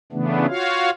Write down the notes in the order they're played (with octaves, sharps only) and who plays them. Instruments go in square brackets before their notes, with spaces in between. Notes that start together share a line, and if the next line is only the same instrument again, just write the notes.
[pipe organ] C#3 E3 A3 B3 D4
F4 F#4 C#5 F5